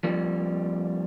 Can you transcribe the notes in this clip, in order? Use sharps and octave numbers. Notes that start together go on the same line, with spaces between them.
F2 D3 F3 G3 A#3